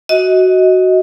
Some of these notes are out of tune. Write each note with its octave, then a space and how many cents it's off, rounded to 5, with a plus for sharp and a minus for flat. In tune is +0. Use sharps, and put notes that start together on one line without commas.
F#4 +5 D#5 +20